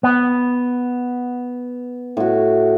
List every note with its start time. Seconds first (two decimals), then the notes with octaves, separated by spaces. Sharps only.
0.03 B3
2.17 A2 F#4